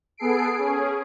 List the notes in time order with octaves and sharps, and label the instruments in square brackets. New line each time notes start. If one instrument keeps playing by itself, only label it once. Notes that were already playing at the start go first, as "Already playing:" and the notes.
[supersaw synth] B3 G#4 A4 C7 D7
C#4 G#4